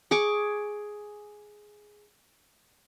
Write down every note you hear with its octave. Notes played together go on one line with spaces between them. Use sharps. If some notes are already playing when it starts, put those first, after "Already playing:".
G#4 C#6 D6